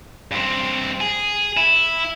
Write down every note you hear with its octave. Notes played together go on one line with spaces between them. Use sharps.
G2 C4
G#4
E4